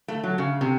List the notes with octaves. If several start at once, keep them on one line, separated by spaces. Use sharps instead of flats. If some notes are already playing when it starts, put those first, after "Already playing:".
A3
F#3
C#3
C3